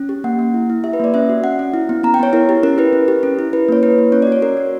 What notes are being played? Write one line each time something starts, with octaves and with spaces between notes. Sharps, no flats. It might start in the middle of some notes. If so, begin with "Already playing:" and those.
Already playing: C#4
G4
A#3 F#5
A#3
E4
E4
G4 E5
B4
A#3 D5
C#4 E5
F#4
C#4 F#5
C#4
E4
B3
B3 A#5
G5
B3 C#5
E4 A#4
G4
C#4 A#4
E4 B4
C#4
G4
C#4
E4
E4 B4
A#3 C#5
E4 B4
A#3
C#4 C#5
D5
F#4 C#5
C#4 A#4
F#4